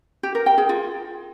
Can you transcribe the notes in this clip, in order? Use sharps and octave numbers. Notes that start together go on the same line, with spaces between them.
G4
A#4
G5
G#4
F4